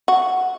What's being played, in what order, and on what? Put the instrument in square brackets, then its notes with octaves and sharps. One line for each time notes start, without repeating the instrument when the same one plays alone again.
[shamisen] F#4